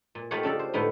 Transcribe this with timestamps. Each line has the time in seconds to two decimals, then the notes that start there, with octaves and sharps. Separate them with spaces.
0.15 A#2
0.31 A3 D#4 F4 G4 C#5 F#5
0.43 C#3 D4 A4 D5
0.59 C5
0.73 A2 D3 B3 D#4